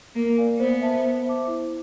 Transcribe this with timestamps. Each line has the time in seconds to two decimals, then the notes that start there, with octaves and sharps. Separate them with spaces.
0.15 A#3 A#4
0.38 D5 F5 G#5
0.59 B3 C5
0.81 E5 A5
1.04 C5
1.25 E5 A5 D6
1.47 E4